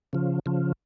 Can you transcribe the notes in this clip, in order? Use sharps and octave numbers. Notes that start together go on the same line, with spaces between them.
C#3 F3
C#3 F3